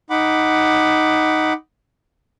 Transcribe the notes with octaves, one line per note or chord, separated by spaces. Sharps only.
D#4 F#5 B5 D6